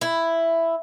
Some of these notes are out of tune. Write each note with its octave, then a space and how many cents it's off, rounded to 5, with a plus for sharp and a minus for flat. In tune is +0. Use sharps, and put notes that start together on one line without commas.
E4 +5